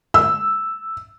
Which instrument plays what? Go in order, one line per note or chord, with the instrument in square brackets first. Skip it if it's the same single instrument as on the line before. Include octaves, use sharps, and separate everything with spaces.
[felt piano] E6